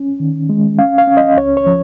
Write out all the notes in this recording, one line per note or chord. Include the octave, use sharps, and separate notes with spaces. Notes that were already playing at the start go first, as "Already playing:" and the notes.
Already playing: C#4
D#3
G#3
C#4 F5
F5
C#4
D#5
C#2 C#5
C#5
F3